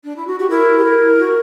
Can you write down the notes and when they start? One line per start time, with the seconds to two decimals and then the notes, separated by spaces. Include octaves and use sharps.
0.04 D4
0.16 E4
0.26 F#4
0.39 F#4 G4
0.50 E4 A#4
0.78 G4
0.84 A#4
1.19 F#4